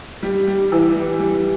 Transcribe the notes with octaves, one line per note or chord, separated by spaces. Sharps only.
G3
G3
E3
G3
G3